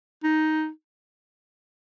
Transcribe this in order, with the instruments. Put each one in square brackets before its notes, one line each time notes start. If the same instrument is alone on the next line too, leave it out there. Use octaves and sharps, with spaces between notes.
[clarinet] D#4